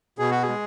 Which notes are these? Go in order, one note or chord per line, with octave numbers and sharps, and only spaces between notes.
B2 G#4
F#4
G#4
G#3